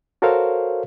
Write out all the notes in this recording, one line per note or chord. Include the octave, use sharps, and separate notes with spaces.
F#4 A4 A#4 C5 C#5 F5